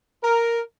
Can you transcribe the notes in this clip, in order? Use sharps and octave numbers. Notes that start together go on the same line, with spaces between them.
A#4